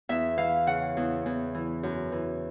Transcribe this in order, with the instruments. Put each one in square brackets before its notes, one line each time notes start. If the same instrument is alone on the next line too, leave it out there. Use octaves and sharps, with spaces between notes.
[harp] E2 E5
E3 F5
C#3 F#5
E2
E2
E3
F#2
E3